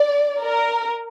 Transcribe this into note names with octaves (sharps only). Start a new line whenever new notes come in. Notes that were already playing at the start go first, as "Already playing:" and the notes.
Already playing: D5
A#4